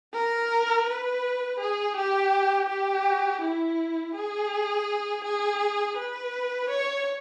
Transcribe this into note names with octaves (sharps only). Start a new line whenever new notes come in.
A#4
B4
G#4
G4
G4
E4
G#4
G#4
B4
C#5